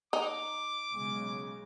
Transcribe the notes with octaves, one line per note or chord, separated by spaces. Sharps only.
D#4 D6
B1 C#3 G#3